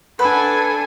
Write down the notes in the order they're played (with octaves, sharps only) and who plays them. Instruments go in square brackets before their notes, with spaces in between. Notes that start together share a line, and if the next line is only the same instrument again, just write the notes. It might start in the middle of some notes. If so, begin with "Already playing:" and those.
[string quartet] D4 [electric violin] A4 G#5 [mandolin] B4 [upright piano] F#5 B5